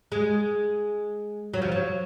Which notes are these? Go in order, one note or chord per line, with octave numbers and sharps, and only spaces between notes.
G#3
F#3
F3
F#3